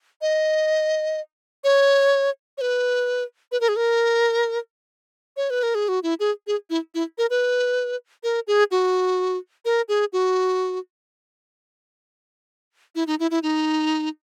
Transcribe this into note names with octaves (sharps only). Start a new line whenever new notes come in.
D#5
C#5
C#5
B4
B4
A#4
G#4
A#4
C#5
B4
A#4
G#4
F#4
E4
G#4
G#4
E4
E4
A#4
B4
A#4
G#4
F#4
A#4
G#4
F#4
E4
D#4
E4
E4
D#4